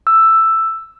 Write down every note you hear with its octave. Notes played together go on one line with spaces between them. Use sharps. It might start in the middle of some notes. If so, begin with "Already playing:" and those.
E6